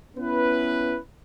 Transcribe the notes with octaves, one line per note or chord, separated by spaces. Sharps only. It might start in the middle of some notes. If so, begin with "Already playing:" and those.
B3 C#4 E4 B4